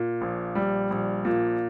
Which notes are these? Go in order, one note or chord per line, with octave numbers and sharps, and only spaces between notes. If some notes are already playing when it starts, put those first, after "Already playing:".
Already playing: A#2
A#1
G3
A#1
A#2